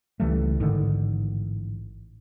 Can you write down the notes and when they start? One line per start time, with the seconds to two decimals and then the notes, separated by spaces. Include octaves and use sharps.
0.20 C#2 E3 G3 A3
0.60 A1 G#2 D3 D#3